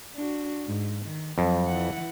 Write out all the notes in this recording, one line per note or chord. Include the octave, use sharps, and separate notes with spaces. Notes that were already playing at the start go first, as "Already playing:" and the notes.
D4 F#4
G#2
D#3
F2 F#3
E3 F#5